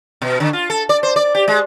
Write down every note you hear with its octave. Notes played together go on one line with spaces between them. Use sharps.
B2
D3
F4
A4
D5
C5
D5
G4
G#3